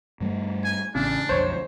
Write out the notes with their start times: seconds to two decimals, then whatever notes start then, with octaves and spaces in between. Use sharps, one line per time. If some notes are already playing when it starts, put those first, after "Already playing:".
0.20 G2 G3 A3
0.64 G#5
0.95 A1 C#3 D4
1.29 B1 F2 D3 C5 C#5